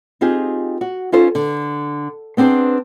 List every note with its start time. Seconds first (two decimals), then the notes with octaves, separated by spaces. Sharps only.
0.21 C4 D#4 F4 G4 G#4
0.81 F#4
1.12 C#4 D#4 F4 A4 C5
1.35 D3
2.37 B3 C4 D4 G#4 C5